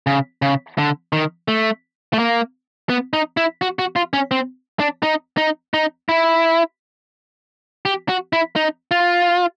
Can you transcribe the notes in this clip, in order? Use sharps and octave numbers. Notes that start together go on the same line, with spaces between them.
C#3
C#3
D3
D#3
A3
A3
A#3
B3
D#4
E4
F#4
F#4
F4
C#4
C4
D4
D#4
D#4
D#4
E4
G4
F#4
E4
D#4
F4